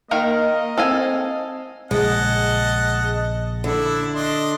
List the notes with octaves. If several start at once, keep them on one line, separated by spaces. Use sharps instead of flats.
D#3 A#3 A#4 D#5 F5
C4 A4 F5 G#5
A#1 C#3 G#3 D#5 F#5 A5
D3 D4 E4
D4 D#5 C6